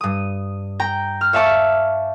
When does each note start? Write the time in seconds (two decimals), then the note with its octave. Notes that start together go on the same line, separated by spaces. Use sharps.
0.01 G2 D#6
0.80 G5 A#5
1.21 F6
1.33 C#5 E5 F5 A5 C#6 D6